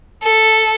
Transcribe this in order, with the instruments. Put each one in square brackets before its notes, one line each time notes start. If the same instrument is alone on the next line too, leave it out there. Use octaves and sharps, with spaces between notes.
[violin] A4